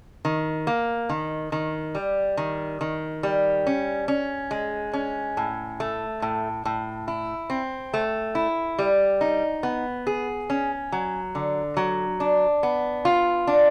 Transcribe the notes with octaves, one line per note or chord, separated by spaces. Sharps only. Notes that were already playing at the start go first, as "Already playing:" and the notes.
D#3
A#3
D#3
D#3
G3
D#3
D#3
G3
C#4
C#4
G#3
C#4
A2
A3
A2
A2
E4
C4
A3
E4
G3
D#4
B3
G#4
C#4
F#3
D3
F#3
D4
B3
F4
D4